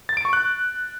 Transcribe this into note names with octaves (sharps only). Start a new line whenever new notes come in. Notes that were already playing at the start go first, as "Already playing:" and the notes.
A6
D7
C#6
F#6